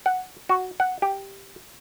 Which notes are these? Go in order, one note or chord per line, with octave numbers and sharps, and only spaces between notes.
F#5
F#4
F#5
G4